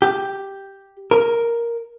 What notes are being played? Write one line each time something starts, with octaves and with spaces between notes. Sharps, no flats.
G4
A#4